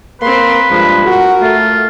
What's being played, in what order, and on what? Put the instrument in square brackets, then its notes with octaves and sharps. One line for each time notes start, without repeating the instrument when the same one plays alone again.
[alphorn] A#3 [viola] C4 C6 [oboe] B4
[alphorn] G2 [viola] F3 G#3
[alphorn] F#4 [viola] A#4
[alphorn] A3 [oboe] F4